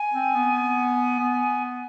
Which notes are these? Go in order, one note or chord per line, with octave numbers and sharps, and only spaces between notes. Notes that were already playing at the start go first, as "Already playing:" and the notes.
Already playing: G#5
C4
B3
B3